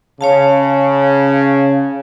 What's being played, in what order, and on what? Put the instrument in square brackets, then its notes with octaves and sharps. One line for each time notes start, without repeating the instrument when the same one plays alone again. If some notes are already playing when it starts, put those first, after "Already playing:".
[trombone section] C#3 [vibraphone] C#5 F5 A5